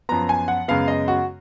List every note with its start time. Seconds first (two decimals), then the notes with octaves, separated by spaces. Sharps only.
0.09 F#2 F3 B3 A#5
0.29 G#5
0.48 F#5
0.68 F#2 C#3 G#3 B3 F5
0.88 D#5
1.08 F#4